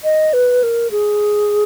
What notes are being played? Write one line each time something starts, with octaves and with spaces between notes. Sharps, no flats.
D#5
B4
A#4
G#4